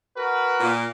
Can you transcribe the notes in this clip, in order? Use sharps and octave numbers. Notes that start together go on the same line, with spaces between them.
F#4 A#4 B4
A#2